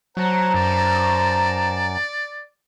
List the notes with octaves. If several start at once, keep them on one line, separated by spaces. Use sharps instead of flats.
F#3 C5 F#5 A5 A#5
F#2 D5